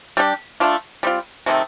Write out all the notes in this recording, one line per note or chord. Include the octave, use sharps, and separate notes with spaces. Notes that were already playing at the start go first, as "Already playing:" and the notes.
G3 D4 G4
A3 D4 F4
G3 C4 F4
C3 D#3 A3 C4